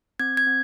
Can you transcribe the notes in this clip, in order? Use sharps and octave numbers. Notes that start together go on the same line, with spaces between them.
C4 G#6
G#6
C4